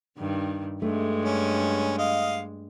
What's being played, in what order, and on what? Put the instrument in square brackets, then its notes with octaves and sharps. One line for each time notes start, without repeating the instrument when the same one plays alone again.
[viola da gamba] G2 D#3
[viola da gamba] G2 G#3 [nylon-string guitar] A3
[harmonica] C#4
D#5 F5